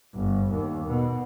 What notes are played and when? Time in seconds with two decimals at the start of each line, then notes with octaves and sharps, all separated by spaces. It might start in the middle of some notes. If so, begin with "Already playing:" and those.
0.14 G1
0.51 D#2
0.89 B2